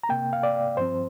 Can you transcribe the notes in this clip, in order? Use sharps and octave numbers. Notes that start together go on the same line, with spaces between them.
A#5
C3 A#3 G5
F5
D5
G2 F3 C4 C5